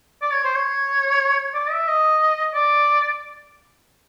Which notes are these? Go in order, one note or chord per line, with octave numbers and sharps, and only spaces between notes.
D5
C#5
C5
C#5
D5
E5
D#5
D5